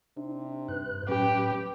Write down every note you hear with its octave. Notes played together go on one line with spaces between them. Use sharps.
C3 D4 D#4
G2 B4 F#6
A2 F#3 C#4 G4 B4